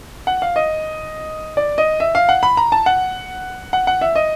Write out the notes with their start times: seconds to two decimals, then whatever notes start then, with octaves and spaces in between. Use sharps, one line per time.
0.27 F#5
0.42 F5
0.56 D#5
1.57 D5
1.78 D#5
2.00 E5
2.15 F5
2.29 F#5
2.43 B5
2.57 A#5
2.72 A5
2.86 F#5
3.73 F#5
3.87 F#5
4.01 E5
4.16 D#5